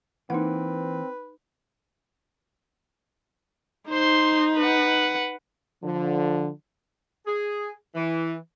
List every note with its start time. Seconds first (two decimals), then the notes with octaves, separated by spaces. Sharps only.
0.30 E3 A#3 C4 D#4 B4 F#5
3.90 D#4 C5 C6
4.57 B4 F#5
5.83 D3 F3
7.26 G#4
7.95 E3